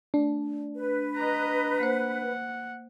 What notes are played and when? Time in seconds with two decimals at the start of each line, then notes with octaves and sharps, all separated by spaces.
0.14 A3 D4
0.75 B4
1.16 D#5 A#5
1.80 A#3 C5 F#5